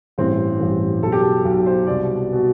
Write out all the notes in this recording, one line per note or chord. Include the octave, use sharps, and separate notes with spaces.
A1 G2 E3 C4
A1 G2 E3
B1 B2 A4
G4
A4
B1 B2
C5
C2 B2 D5
B2